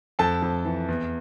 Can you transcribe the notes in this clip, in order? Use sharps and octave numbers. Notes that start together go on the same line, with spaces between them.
F2 A4 A5
F2
E3
E2